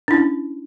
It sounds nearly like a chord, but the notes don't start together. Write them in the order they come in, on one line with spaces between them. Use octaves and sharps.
D4 E4 C#4